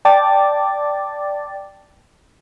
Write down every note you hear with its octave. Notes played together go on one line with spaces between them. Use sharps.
D5 G5 A5 D6 A6